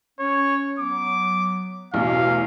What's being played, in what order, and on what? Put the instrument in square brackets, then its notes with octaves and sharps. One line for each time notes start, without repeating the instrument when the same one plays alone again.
[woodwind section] C#4 [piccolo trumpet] C#5
[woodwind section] F#3 B3 [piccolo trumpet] D6
[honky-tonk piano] A1 E2 [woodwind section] B2 [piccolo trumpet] F5